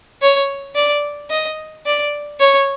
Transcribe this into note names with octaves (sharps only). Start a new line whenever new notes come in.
C#5
D5
D#5
D5
C#5